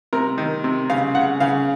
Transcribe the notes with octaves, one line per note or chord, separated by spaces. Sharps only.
C3 A#4
D#3
C3
C#3 F5
C#3 F#5
C#3 F5